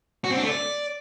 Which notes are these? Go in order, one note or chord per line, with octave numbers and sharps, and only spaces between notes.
F#4
C4
D4
A3
D5